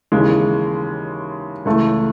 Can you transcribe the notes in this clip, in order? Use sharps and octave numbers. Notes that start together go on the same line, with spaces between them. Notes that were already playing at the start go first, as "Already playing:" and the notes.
D#2 C#3 E3 G#3
C#2 C#3 E3 A3